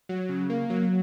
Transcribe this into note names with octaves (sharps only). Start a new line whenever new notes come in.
F#3
C#3
A#3
F#3